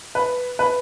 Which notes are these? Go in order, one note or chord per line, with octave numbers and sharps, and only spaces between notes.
B4
B4